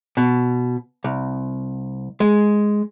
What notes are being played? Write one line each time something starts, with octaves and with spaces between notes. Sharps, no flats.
B2
C2
G#3